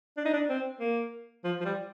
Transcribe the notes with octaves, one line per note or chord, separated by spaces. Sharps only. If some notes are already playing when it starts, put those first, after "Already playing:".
D4
D#4
D4
C4
A#3
F3
F3
G3